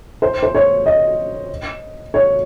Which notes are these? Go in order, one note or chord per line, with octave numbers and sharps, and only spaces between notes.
C5
C5
C#5
D#5
C#5